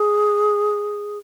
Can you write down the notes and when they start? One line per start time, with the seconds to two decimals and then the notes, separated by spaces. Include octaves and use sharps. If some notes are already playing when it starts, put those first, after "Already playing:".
Already playing: G#4